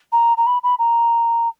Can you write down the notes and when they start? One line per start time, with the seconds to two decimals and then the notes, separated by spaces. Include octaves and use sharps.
0.12 A#5
0.37 A#5
0.46 B5
0.63 B5
0.78 A#5